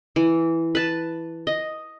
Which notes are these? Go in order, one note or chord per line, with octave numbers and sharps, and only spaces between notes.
E3
B4 A5
D#5